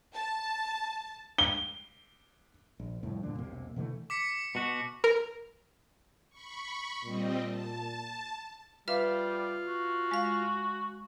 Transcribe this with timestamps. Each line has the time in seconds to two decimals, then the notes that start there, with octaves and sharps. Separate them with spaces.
0.14 A5
1.38 G7
2.80 A#1
3.03 C2 F2 A2
3.23 G2 A#2 D3 D4
3.39 E1 B1 C3 A#3
3.76 B2 D3 E3 A3
4.10 D6 B6 C#7
4.55 B2 F#4
5.04 A#4
6.30 B5 C#6
7.04 A#2 G3 C4 D#5
7.48 A5
8.88 G3 F4 B4 E5 F5
9.67 F#4
10.11 G#3 F5